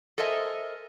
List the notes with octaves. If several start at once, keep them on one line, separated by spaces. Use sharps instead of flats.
A4 A#4 C5 D#5 E5 G#5